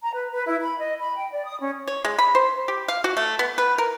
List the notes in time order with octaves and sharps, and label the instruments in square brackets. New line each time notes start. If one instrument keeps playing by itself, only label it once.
[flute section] A#5
B4
B4
E4
B5
D#5
B5
G5
D5
D#6
C#4
[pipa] C#5
G#3
B5
C5
G4
F5
F#4
A3
B3
B4
A#4